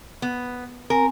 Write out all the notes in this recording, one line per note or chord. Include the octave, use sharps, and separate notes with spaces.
B3
C4 A#4 G#5